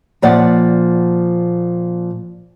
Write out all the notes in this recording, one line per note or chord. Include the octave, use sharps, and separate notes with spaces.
A#2 F3 D5 F#5